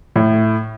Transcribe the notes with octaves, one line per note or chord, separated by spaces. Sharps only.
A2